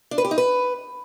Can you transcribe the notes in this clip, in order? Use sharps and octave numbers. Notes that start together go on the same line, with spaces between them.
D4
B4
G4
D#4
B4